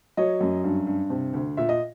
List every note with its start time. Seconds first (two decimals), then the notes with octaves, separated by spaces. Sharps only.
0.17 F#3 C#5 D#5
0.41 F#2
0.64 G2
0.87 G2
1.10 C3
1.33 D2
1.57 A#2 E5
1.69 D#5